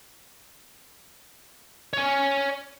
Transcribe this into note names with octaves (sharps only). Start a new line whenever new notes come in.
C#5 G#5